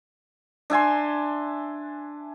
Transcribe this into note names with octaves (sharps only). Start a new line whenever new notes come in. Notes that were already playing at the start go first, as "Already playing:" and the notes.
D4 E5 G#5 C6